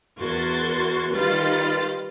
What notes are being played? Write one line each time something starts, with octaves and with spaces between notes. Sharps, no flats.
E2 F#4 A#4 C6 G#6 A6
D#3 G3 F4 B4 A6